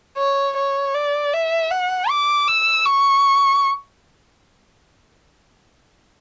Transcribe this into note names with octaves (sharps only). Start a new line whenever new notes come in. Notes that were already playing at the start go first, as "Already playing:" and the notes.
C#5
C#5
D5
E5
F#5
D6
E6
C#6